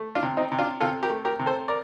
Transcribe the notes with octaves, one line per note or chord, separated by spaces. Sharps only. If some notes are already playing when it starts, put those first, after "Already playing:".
Already playing: A3
D4 F4
C3
C4 D#4
C3
D4 F4
C3 F4 A4
G4 A#4
A3
G4 A#4
C3
A4 C5
A#4 D5